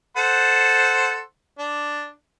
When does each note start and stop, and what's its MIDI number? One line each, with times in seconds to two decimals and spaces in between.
0.17 1.19 69
0.17 1.19 72
0.17 1.19 78
1.58 2.09 62